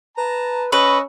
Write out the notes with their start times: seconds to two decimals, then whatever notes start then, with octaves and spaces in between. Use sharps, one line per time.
0.18 B4 A5 A#5
0.72 C#4 B4 D#5 C#6 E6